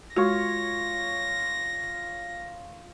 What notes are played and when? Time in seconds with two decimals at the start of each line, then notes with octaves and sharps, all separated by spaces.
0.16 G#3 F4 F#4 C#5 A#6